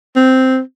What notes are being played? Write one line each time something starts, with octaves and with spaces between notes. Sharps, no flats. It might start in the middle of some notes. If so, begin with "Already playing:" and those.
C4